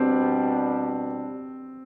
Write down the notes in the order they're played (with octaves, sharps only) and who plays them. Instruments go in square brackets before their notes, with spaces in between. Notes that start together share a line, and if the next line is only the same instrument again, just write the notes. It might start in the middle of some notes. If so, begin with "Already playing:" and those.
Already playing: [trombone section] B2 G3 D4 [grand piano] C4